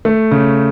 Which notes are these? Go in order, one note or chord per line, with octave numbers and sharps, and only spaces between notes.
A3
C#3